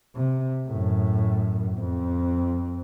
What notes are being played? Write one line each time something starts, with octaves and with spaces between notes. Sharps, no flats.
C3
F#2 A2
F2 C4